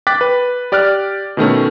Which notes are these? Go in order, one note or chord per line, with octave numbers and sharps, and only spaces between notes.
G5 D6 F#6 A6 B6
B4
G4 D5 D6 F6 F#6
B2 D#3 A3 C#4